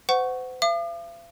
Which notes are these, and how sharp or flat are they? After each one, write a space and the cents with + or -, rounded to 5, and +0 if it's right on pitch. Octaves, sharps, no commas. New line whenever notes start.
C5 -40 F#5 +0 C#6 +0
F5 -45 D6 +45